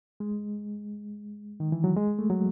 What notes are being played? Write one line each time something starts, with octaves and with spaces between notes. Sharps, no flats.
G#3
D#3
E3
F#3
G#3
A3
F#3